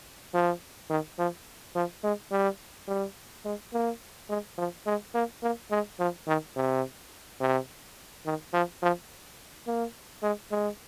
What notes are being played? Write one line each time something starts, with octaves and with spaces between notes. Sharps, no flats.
F3
D#3
F3
F3
G#3
G3
G3
G#3
A#3
G#3
F3
G#3
A#3
A#3
G#3
F3
D#3
C3
C3
D#3
F3
F3
A#3
G#3
G#3